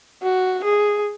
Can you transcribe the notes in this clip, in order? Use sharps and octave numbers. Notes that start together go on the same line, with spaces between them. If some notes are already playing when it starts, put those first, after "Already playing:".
F#4
G#4